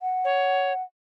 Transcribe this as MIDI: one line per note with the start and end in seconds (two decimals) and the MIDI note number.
0.01 0.83 78
0.25 0.73 73